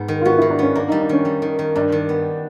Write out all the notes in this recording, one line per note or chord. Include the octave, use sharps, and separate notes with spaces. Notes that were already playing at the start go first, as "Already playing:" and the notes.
Already playing: G#2 B3
D#3
F4
B3 F#4
D#3 E4
D4
B3 C#4
A#3 D4
G3 D#4
D4
D#3 C#4
G3
D#3
D#3
G2 D4
D#3
B3